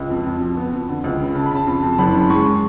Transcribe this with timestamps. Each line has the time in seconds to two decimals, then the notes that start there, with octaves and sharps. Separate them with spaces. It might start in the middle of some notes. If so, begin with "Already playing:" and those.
Already playing: C#2
0.10 F2
0.26 F2
0.41 F3
0.57 B3
0.72 F2
0.89 D3
1.04 C#2
1.20 C#3
1.35 C#3 A5
1.46 B5
1.51 C#3 A5
1.67 F2 A5
1.83 F2
1.93 A5
1.98 F#1 B5
2.14 C#3
2.30 G#3 C#6